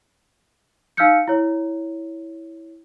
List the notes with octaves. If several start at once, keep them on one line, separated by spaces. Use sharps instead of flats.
D#4 F5 E6 F6 G6 C#7
E4 C#5